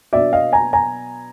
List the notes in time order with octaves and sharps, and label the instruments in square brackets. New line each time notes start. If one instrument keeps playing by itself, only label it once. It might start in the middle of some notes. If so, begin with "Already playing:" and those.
[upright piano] B2 F#3 B3 D4 D5 E5
D#5 F5
G#5 A#5
G#5 A#5